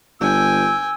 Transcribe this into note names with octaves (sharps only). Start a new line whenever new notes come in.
G1 G5 G#5 E6